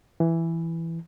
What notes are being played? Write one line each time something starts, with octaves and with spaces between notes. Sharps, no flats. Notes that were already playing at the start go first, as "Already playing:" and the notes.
E3